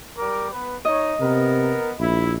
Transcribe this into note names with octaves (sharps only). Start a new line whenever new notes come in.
G3 A#4 D6
B3 B4
D#4 C#5 D#5
C3 B3 A#4
A#1 E4